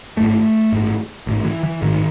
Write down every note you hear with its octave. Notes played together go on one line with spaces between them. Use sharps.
A1 G#2 A3
A1 G#2
A1 G#2
E3
E3
A1 G#2 D#3